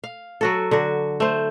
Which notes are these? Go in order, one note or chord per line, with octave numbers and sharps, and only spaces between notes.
F5
F#3 F#4 A4
D3 F#4
A3 C5